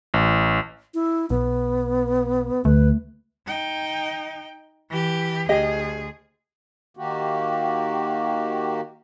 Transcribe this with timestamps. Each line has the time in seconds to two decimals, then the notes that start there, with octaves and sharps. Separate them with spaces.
0.14 A1
0.94 E4
1.30 B1 B3
2.65 D2 A3 B4
3.46 D#4 G5
4.90 E3 G4
5.49 D2 G4 G#4 D#5
6.97 D#3 A#3 F#4 G4